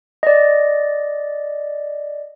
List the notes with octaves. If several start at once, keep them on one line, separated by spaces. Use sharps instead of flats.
D5 D#5